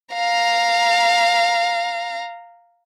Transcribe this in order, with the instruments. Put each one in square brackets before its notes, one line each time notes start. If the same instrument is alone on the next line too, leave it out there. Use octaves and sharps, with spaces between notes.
[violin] F5 A#5